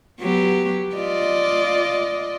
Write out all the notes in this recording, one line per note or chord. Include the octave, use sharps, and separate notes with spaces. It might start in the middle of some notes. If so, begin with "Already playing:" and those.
F#3 B3 G4
F4 D5 D#5